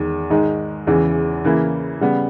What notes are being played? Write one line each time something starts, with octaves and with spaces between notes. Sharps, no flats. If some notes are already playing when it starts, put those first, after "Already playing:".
Already playing: E2 D#3 G#3
G#2 D#3 G#3 D#4
E2 C#3 E3
C#3 E3 A#3 E4
C#3 G3 B3